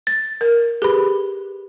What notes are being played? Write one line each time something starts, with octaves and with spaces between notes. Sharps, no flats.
A6
A#4
G4 G#4 B4 B5